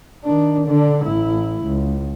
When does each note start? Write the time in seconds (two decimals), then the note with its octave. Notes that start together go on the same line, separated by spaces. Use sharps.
0.24 D#3 D4
0.66 D3 D4
1.05 A1 E4
1.65 C#2